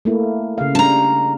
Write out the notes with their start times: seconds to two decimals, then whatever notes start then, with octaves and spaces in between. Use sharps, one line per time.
0.05 A3 A#3 E4
0.58 C#3 F5
0.75 G3 D4 A5 A#5